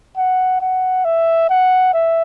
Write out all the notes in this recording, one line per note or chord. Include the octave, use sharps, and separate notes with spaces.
F#5
F#5
E5
F#5
E5